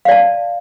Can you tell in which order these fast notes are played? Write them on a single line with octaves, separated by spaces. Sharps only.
F5 D5 A5